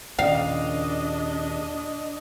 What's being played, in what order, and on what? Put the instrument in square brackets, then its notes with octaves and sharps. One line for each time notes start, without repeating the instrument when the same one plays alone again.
[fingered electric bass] D#2 A#2 C#3 [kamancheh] D4 D#5 [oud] F5